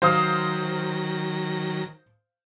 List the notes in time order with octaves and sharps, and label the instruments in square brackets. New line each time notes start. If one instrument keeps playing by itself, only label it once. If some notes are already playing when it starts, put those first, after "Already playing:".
[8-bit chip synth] D#3 F#3 A#6 [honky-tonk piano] C5 F5 D#6